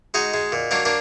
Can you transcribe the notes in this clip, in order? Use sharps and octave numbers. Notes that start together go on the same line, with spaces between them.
G#3 D#4 F#4
G#3
A#2
F#3 A#3 D4
A#3 D4